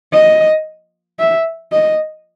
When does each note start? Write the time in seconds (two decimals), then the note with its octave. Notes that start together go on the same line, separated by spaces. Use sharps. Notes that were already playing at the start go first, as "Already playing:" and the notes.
0.13 D#5
1.19 E5
1.72 D#5